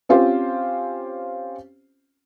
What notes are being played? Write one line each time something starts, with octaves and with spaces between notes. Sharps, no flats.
C4 C#4 F4 G4 C5